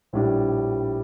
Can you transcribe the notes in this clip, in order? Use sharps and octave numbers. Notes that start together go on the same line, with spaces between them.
A#1 A2 G3 D4